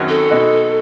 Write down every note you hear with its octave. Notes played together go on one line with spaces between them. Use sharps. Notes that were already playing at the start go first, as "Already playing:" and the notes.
Already playing: G#1 F#2 D#3 F#3 C#4
A4
B2 G#3 D#4 F#4